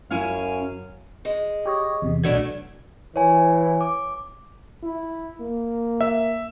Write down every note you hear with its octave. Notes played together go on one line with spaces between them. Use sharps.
F#2 C#4 E4 F5 G#5
G#3
G4 C#5 D#5
E2 C3
B1 B2 F#3 A3 D4 G#6
E3 C#5 G#5
D6
E4
A#3
E5